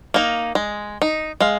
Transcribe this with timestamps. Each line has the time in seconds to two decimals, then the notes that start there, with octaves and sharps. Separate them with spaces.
0.14 A#3 D#4
0.55 G#3
1.02 D#4
1.40 G#3 F5